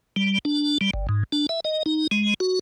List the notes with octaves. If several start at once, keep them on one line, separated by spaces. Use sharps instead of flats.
G3
D4
G3
G1
G#2
D4
E5
D#5
D#4
G#3
F#4